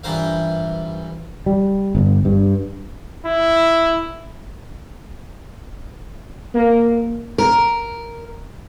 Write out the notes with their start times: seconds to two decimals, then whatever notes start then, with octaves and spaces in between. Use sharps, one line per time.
0.04 G2 E3 F4 A#4 C5 F5
1.46 G3
1.95 G1
2.25 G2
3.26 E4
6.54 A#3
7.38 A#4